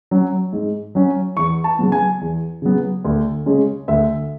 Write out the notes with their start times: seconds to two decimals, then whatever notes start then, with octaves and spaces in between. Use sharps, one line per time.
0.11 F#3 C#4
0.53 G#2
0.95 F#3 C#4
1.37 E2 C#6
1.64 A5
1.79 C#3 F#3 B3
1.92 G#5
2.21 E2
2.62 C#3 F#3 B3
3.05 D2
3.46 C#3 G#3 C#4
3.88 D2 E5